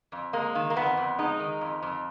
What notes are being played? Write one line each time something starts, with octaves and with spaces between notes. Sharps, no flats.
F2
G#3 A#3
D#3
A#3
F2 B3
F2
G#3 D#4
D#3
F2
F2